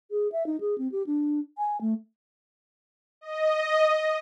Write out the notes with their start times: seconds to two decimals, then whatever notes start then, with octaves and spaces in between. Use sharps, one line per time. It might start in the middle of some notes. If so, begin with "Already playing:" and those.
0.11 G#4
0.32 E5
0.46 D#4
0.60 G#4
0.78 C4
0.92 G4
1.07 D4
1.58 G#5
1.81 A3
3.21 D#5